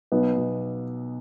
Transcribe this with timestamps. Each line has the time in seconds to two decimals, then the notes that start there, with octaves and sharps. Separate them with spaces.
0.12 B1 B3
0.37 B2